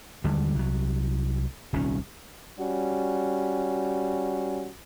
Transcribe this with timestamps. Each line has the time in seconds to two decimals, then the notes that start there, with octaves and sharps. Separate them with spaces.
0.24 D#2 D3 G3 G#3
0.55 C2 F#3
1.73 D#1 C2 D#3 C#4
2.58 G3 C#4 F#4